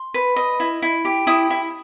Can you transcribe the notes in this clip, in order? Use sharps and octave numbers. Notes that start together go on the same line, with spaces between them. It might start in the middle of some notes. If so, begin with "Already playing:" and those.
Already playing: C6
B4
D#5
E4
E4
G4
E4 D#6
E4